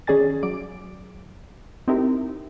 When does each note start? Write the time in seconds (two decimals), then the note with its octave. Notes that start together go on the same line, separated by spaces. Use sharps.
0.07 D#3 C#4 G#4 D5 G#5 A6
0.43 F#3 D5 D7
1.88 C4 D#4 E4 G4 A#4